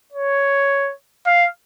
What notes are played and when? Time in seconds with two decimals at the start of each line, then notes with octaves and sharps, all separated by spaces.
0.13 C#5
1.26 F5